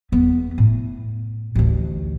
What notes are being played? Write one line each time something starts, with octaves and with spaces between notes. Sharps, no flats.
E2 B3
A2
A1 D2